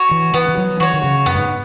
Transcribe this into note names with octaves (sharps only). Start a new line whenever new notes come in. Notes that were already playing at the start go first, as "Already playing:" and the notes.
Already playing: F#4 C#5
E3
E3 B3
E3
F#3
E3 F#4 C#5
D#3
C#3
F#2 B3
G#2